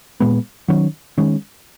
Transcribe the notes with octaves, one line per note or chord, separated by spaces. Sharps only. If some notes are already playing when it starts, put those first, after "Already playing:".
A#2 G#3 B3
D#3 F#3 C#4
D#3 G#3 C#4